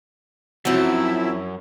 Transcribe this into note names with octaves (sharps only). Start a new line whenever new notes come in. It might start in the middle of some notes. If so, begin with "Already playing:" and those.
F#2 F3 F#3 C4 E4